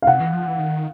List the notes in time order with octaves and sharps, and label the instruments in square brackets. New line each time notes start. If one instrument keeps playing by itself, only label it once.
[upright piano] F5
[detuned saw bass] C3 [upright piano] F#5
[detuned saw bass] E3
F3
E3
D#3